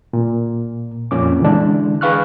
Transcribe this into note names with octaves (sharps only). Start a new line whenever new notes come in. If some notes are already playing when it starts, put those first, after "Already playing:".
A#2
F2 A#2 C#4 D6
D3 E3 G#3 D4
G#4 B4 F5 C#6 F6 F#6